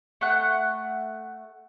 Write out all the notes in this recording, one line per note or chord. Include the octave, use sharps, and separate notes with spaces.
A3 F#5